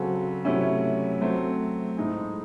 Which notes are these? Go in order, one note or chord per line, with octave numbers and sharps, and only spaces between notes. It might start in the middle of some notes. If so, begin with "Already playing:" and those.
Already playing: C#3 F#3 C4 F#4 A4
C3 F#3 A3 C#4 E4
F#3 A3 C4
A2 G#3 D#4 G#4